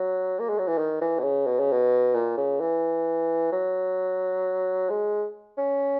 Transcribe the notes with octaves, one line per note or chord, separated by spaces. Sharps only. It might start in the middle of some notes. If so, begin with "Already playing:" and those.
Already playing: F#3
A#3
G#3
F#3
E3
D#3
E3
B2
C#3
B2
C#3
B2
A#2
C#3
E3
F#3
G#3
C#4